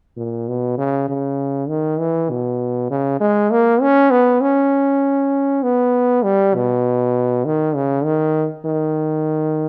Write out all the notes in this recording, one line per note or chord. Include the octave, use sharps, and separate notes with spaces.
A#2
B2
C#3
C#3
D#3
E3
B2
C#3
G#3
A#3
C#4
B3
C#4
B3
G3
B2
D#3
C#3
D#3
D#3